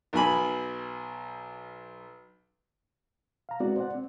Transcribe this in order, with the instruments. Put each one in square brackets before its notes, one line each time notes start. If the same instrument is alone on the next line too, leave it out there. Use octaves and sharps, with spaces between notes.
[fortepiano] B1 B2 G#5 B5
[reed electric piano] F5 A#5
G#3 B3 C4 E4 F#4 D5
C5 D5 F#5
C4